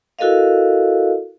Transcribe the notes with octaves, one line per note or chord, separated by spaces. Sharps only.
E4 F#4 A4 A#4 D#5 F5